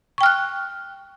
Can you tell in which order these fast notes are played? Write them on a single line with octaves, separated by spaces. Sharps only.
C#6 G5 F6 F#6